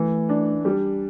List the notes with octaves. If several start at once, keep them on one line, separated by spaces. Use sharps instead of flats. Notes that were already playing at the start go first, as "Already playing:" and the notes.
Already playing: E3 A3
D4
G3